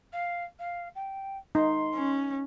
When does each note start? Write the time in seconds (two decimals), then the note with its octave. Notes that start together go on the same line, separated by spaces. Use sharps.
0.12 F5
0.59 F5
0.95 G5
1.55 D#4 C6
1.94 C#4